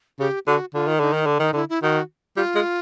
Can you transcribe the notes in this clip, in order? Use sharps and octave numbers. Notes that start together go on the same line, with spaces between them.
C#3 G4
D3 F#4
D3 F4
D#3
D3 D#4
D#3
D3
D#3 D#4
D3 E4
E4
D#3 F#4
G3 F4
G#3